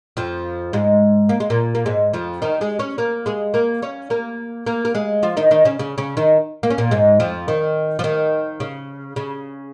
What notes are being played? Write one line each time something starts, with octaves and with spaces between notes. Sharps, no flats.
F2 F3
G#2 G#3
A#3
G#3
A#2 A#3
A#3
G#2 G#3
F2 F3
D#3 D#4
G#3 G#4
C#4 C#5
A#3 A#4
G#3 G#4
A#3 A#4
C#4 C#5
A#3 A#4
A#3 A#4
A#4
G#3 G#4
F3 F4
D#3 D#4
D#3 D#4
C#3 C#4
C#3 C#4
C#3 C#4
D#3 D#4
A#3
C#4
A#2 A#3
G#2 G#3
F2 F3
D#3
F3
D#3
C#3
C#3